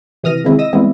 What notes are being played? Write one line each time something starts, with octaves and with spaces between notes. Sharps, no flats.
C3 E3 D#6 F6 A#6
C3 D#3 G#3 C4 E4
D#5 D#6 E6 A#6
E3 G3 G#3 B3 C4 E4